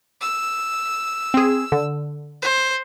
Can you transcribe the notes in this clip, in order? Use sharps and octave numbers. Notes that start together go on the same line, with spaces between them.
E6
C4 G#4
D3
C5